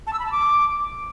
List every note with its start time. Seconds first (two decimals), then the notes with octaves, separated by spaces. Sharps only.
0.07 A5
0.13 E6
0.19 B5
0.26 A5
0.32 D6